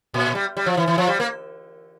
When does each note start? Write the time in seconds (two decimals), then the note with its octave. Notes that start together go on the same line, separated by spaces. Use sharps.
0.14 A#2
0.35 G3
0.57 G3
0.66 F3
0.77 E3
0.88 E3
0.98 F3
1.08 G3
1.20 A#3